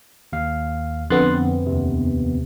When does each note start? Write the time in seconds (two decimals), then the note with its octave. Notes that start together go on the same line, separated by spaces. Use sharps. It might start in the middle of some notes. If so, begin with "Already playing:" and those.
0.33 D#2 F5
1.10 F2 D3 B3 C6 F#6 A6
1.34 C4
1.66 D#2 C3